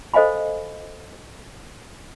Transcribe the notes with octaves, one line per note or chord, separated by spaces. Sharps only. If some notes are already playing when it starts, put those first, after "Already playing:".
A4 C5 D#5 F5 G#5 B5